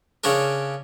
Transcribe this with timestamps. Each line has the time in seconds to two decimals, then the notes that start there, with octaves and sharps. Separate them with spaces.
0.24 C#3 C#4 D4 A#4